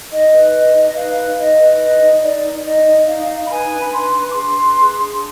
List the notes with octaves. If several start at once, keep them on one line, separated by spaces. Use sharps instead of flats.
D#4 D#5
B4
D#4 D#5
D#4
D#5
B4 F5
D#4
D#4 D#5
B4
D#4 D#5
D#4
D#4 D5
D#4
D#4 D#5
D#4
D#4 F5
D#4
B5
B4 G#5
D4
B5
B4 C6
D4
D6
G#4 C6
B4
G#4
D4